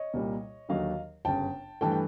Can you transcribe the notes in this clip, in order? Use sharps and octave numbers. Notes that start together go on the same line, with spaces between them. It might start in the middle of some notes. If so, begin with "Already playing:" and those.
Already playing: C#5 D#5
C2 A#2 G3 A#3
D#2 D3 F#3 D#5 F5
G1 F#2 C#3 G5 A5
G2 E3 A3 G5 A5
G5